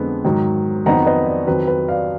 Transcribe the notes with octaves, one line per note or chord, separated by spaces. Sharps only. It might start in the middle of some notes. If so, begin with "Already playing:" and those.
Already playing: F2 D3 G#3 B3
G#2 D#3 F#3
F2 D#3 F#3 B3 D#4 F#5 A#5
B4 D#5
D5
F2 D#3 F#3 B4
B4
D5 F5